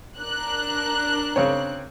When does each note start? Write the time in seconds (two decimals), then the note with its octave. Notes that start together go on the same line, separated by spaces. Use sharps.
0.21 D4 A#4 F#6
1.36 C#3 C4 C#5